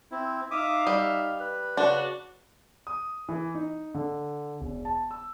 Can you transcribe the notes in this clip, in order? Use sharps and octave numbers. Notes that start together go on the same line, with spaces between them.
C4 E4
D#4 E5 F5 D6 D#6
G3 E5
B4
C#3 D4 F#4
D#6
E3
D#4
D3
E1
A5
E6